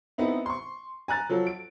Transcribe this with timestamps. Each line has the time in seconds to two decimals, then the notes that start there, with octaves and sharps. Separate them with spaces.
0.18 B3 C4 D#4 E4
0.46 C6 C#6
1.08 G#5 A#5 F#6 A6
1.29 F3 F#3 F4 A4
1.47 D7